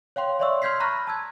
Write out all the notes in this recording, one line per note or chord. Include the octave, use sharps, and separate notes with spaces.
C#5 F5 G5 C6
C#5 D5 E5 C6 C#6 E6
C6 F6 G6 G#6 B6 C7
A#5 B5 C#6 F6 F#6 A#6
A5 E6 G#6